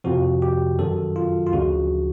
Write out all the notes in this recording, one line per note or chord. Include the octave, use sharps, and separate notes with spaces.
F2 C3 F3 F#4
G4
F#2 D#3 F#3 A4
F4
F4
D2 C#3 F3 F#4